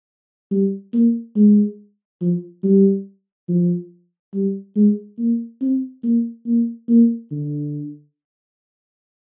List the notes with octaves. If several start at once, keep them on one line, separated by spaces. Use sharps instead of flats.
G3
A#3
G#3
F3
G3
F3
G3
G#3
A#3
C4
A#3
A#3
A#3
D3